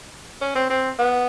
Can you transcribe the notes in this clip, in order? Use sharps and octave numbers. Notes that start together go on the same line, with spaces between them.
C#4
C4
C4
B3